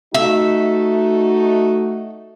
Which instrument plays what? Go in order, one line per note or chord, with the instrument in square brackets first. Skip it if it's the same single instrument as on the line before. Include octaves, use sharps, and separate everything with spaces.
[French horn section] A3 D#4 F#4 [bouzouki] E5